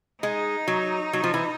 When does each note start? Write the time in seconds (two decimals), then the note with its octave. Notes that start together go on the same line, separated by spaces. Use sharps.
0.23 G#3 D#4
0.68 F#3
1.13 F#3
1.24 F3
1.34 E3